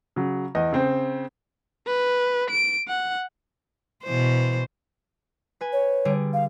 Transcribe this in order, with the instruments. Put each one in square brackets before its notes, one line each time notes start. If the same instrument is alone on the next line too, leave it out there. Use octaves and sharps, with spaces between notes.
[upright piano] C#3 F#3
E2 D#5
C#3 C4 C5
[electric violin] B4
D7
F#5
[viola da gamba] B2 E3 C5
[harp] B4 G#5
[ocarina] C#5
[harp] D3 G3 G#4
[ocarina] F5